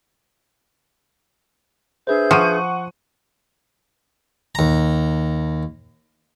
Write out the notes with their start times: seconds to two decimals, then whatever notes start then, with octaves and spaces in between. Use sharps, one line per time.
2.07 D4 G#4 B4 C5 E5 G6
2.31 F3 F#5 C#6 D#7
4.55 D#2 A#5